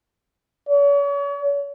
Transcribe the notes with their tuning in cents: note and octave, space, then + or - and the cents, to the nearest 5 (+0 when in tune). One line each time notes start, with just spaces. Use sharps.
C#5 +40